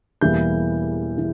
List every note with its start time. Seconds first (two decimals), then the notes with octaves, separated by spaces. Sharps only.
0.21 E1 E2 E3 G3 A#3 G6
1.18 E3